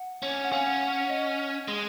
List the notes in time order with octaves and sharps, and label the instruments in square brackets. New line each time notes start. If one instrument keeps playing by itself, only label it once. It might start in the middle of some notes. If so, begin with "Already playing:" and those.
Already playing: [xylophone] F#5
[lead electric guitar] C#4
[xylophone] F#5
[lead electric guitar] C#4 [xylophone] F5 G#5
[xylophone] F#5
F#5
F#5
D#5
[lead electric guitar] G#3